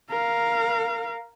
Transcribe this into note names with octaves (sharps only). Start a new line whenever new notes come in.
A#4 F5